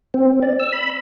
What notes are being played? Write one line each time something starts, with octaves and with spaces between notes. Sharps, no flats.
C4
D5
E6
B5